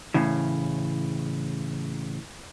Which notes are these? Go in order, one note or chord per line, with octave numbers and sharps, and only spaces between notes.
A2 C#3 E3